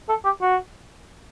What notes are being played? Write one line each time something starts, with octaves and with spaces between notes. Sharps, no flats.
A4
G4
F#4